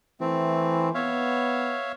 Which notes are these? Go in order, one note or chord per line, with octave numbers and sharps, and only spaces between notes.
E3 A3 C4
B3 C#5 E5 F5